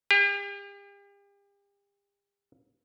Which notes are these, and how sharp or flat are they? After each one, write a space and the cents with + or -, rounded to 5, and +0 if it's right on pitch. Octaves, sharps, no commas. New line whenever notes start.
G4 +40